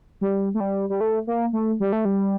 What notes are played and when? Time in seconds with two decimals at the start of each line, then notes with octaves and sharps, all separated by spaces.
0.21 G3
0.54 A3
0.60 G3
0.90 G3
1.01 A3
1.27 A#3
1.53 A3
1.80 G3
1.92 A3
2.05 G3